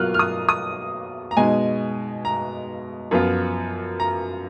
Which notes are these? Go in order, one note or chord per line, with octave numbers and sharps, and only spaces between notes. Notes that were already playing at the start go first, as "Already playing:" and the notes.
Already playing: B2 F#3 A#3 F4 F6 F#6
F6
D#6
D#6
A#5
B2 G#3 D#4 G#5
A#5
F#2 F3 B3 F4
A#5